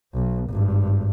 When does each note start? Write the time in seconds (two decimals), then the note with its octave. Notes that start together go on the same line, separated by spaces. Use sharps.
0.14 B1
0.50 G#1 G2